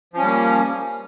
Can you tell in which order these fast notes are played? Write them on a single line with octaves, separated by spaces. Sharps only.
F3 C#4 G3 A#3